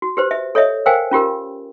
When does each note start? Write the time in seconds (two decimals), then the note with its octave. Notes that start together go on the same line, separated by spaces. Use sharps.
0.02 F#4
0.17 G4 B4 C5
0.31 E5
0.55 A4 C#5 D#5 E5
0.86 A#4 C5 F5 G5 G#5
1.11 C#4 F4 G4 A#4